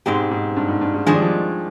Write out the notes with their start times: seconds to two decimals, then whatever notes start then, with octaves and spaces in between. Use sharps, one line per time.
0.06 G#2 B2 G#3 C4 G4
0.31 G#2
0.56 G2
0.68 G#2
0.81 G2
0.94 G#2
1.06 D#3 F3 G#3 D4 G#4
1.14 G3
1.22 F3